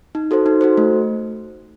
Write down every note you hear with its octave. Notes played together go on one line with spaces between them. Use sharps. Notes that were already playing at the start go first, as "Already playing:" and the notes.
D#4
F#4 A4 C5
D#4
F#4 A4 C5
A3